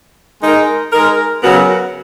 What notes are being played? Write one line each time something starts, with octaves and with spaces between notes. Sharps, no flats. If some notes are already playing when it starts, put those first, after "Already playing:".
G#3 D#4 A#4
G#3 D#4 A#4
C#3 F#3 B3 F#4 A#4